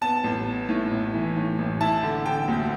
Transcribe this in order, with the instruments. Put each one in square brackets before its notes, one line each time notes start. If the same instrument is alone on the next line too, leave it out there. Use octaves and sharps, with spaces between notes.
[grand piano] B3 A5
A1
B3
A2
A1
E3
A2
A1
E4 A5
D3
D3 G5
D2